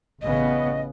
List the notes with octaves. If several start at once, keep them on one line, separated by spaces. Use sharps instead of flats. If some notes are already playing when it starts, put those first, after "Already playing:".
A1 C#3 B3 D#5